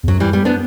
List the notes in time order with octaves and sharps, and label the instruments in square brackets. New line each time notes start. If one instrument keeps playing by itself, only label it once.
[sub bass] E2
[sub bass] F#2 [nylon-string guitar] F#3
[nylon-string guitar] E3 G3
G3 B3
B3 D4